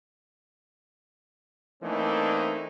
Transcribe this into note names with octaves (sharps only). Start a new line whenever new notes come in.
E3 A3 A#3 C4 D4 D#4